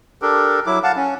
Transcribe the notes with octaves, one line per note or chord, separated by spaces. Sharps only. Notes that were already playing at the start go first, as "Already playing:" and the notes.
D4 G4 A4 A#4
F#3 E4 D6
F5 F#5 A5
C#4